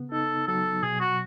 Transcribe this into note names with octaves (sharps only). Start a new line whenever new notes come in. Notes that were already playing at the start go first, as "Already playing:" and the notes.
Already playing: C#3 B3
D#4 A4
F#3 A4
B2 G#4
F#4